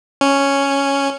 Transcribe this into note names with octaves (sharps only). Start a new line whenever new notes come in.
C#4